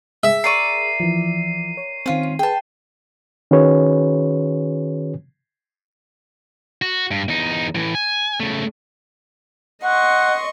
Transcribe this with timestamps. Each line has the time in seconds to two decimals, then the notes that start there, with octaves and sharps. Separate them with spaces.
0.23 G#4 E5
0.44 A#4 D5 C#6 C7 D#7
1.00 E3 F3
1.77 C#5
2.06 D#3 C4 C#4 F4
2.39 G#4 B4 G5 A5
3.51 D#3 C#4 F#4 G#4 B4 C#5
6.82 F#4
7.11 G2
7.29 E2 D#4
7.75 A2 E3
7.95 G#5
8.40 C#3 A3
9.84 D#5 F#5 C6 C#6